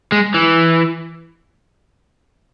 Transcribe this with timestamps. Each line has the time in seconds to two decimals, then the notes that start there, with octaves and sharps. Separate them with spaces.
0.12 G#3
0.35 E3